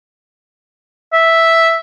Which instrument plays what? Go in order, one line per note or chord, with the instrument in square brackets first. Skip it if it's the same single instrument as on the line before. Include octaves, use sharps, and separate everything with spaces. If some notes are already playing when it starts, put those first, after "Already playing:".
[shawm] E5